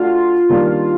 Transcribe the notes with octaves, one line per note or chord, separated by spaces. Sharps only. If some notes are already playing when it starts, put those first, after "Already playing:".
Already playing: A3 D4 F4 F#4
D#3 G3 A#3 D4